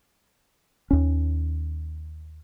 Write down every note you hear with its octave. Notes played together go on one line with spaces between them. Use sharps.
D#2 C#4